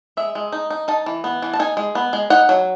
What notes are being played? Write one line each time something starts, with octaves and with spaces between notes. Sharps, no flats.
G#3 E5
G#3
D#4
D#4
D#4 A5
E3
B3
E3
A5
D#4 G#5
G#3
B3
G#3
D#4 F#5
F#3